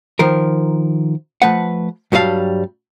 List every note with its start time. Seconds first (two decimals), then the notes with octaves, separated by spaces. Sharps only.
0.19 D#3 F3 A#4
1.42 F3 A3 B4 F#5
2.12 G2 F#3 G3 F#4 F5 A5